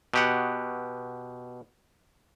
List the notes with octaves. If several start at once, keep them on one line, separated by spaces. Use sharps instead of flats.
B2 G4 F#5